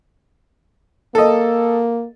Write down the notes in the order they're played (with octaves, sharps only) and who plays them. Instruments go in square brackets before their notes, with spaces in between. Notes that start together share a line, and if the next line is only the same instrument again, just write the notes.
[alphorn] A#3 [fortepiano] A4 D#5